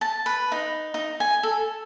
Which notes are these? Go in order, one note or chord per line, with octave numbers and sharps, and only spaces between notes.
A5
B4
D#4
D#4
G#5
A4